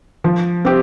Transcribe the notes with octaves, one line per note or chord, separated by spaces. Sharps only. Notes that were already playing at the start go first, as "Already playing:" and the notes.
F3
C4 G4